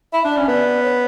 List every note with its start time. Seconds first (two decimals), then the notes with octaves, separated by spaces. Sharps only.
0.13 E4 E5
0.24 D4
0.31 D5
0.37 C#4
0.48 B3 D5
0.83 C#5